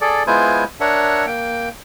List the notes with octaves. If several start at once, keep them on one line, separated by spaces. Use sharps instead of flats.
G#4 A4 D5
G#3 B3 E4 F4 C5 G#5
D4 A#4 C#5 E5 F#5
A#3 G5